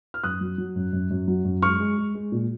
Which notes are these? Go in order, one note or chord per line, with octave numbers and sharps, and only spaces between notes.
F6
F#2 D#6 F#6
F#3
F#3
F#2
F#2
F#2
F#3
F#2
G#3 C#6 F6
G#3
G#3
G#3
A#2